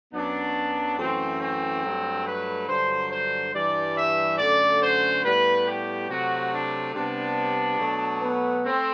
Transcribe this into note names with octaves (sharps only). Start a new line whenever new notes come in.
F#2 F#3 B3 D4
F#2 E3 A3 C4
C4
G2 F#3 A3
B4
G2 D3 F#3 C5
C5
G2 E3 G3 D5
E5
F#2 D3 A3 D5
C5
A2 G3 B3 B4
G4
C3 F#3 A3 F#4
D4
C3 G3 B3 D4
B2 F#3 A3
B3
A3 C4